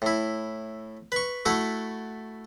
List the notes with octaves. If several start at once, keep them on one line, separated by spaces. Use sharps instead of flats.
A2 E4
B4 C#6
A3 E4 F#4 A4